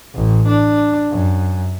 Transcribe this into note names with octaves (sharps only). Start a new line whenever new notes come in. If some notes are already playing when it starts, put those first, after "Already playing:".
A1
D4
F#2